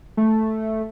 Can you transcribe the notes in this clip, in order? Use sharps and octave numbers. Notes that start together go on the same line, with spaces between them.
A3